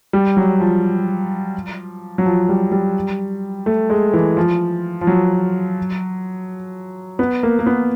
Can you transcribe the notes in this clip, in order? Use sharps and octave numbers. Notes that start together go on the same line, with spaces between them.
G3
F#3
F3
F#3
F3
G3
G3
A3
G#3
E3
F3
F3
F#3
B3
A#3
A#3
B3